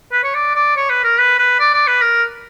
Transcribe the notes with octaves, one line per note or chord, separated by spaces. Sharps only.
B4
C#5
D5
D5
C#5
B4
A#4
B4
B4
D5
D5
B4
A#4